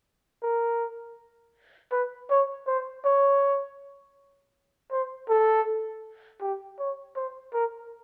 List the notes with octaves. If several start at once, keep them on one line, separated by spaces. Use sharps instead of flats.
A#4
B4
C#5
C5
C#5
C5
A4
G4
C#5
C5
A#4